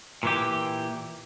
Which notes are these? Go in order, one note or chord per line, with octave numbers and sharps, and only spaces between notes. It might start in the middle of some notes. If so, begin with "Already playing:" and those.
A#2 E3 G4